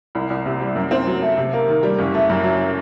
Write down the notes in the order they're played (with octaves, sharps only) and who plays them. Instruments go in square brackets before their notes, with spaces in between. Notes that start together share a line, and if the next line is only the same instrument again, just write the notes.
[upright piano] C2
C2
C3
G3
F#2
C4
F#3
A3
C3
A#3
D#3
G3
F#1
A3
F#2
F#3